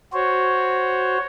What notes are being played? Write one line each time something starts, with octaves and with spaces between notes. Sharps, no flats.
F#4 C5 C#5